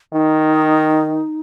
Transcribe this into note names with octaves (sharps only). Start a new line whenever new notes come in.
D#3 D#4